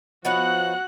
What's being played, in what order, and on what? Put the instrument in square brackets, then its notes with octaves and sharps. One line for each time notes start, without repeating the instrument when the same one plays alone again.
[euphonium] F3 [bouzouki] B3 D#4 C#5 [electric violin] F#4 F#6 [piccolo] F#5